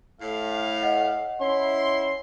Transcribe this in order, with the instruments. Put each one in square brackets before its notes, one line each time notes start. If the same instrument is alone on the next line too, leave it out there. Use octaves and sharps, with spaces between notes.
[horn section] A2 F5
[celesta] D#5 F#5
[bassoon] C#4 [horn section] E4 C6